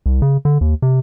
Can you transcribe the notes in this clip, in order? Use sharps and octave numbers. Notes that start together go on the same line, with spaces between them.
C2
C#3
D3
D#2
C3